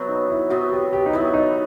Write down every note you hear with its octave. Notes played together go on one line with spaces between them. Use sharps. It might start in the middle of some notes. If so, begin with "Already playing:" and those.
Already playing: C3 F#3 B3
D#4
E4
C3 F#3 B3 F#4
G4
G4
D#4
C3 F#3 B3 E4
D#4